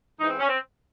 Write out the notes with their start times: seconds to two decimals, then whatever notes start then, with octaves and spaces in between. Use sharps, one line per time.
0.17 G#2 E3 D#4
0.28 C4
0.38 C#4
0.47 C4